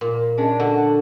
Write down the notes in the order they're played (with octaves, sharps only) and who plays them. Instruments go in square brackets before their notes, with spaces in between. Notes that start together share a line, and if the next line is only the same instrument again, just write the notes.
[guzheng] A#2
[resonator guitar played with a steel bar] G#3 C#4 D4
[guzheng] D3 [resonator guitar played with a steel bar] F#4